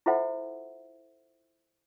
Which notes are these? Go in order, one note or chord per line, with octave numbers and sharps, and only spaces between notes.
E4 F4 A4 C5 E5 F#5